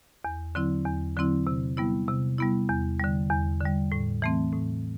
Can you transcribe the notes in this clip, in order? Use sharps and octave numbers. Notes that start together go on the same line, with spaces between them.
E2
D3 F#3 C4 E4
E2
D3 F#3 C4 E4
C3
G3 B3 E4
C3
G3 B3 E4
E2
D3 G3
E2
D3 G3
A2
E3 A3 C4
A2